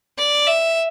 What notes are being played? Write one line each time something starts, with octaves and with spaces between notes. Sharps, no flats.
D5
E5